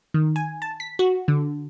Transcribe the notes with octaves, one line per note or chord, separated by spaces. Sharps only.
D#3
G#5
A5
B6
F#4
D3